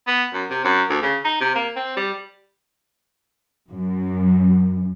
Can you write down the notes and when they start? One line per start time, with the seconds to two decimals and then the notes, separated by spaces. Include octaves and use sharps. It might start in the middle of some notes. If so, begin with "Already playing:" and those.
0.07 B3
0.33 F#2
0.50 C3
0.65 F#2
0.90 D2
1.02 C#3
1.24 D#4
1.41 C3
1.55 A#3
1.76 C4
1.97 G3
3.70 F#2